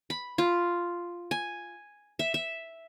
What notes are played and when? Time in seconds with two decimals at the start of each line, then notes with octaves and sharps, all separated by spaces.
0.10 B5
0.38 F4
1.31 G#5
2.19 E5
2.34 E5